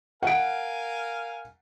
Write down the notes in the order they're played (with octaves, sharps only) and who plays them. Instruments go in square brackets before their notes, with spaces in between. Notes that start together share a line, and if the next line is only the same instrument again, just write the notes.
[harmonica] A#4 F5 G#5 [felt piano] F#5 D7